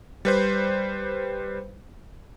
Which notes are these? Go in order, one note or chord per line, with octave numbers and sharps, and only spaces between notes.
G3 B4 C5